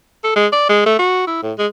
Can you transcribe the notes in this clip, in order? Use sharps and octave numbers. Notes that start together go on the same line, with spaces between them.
A4
G#3
D5
G#3
A3
F#4
E4
A2
G#3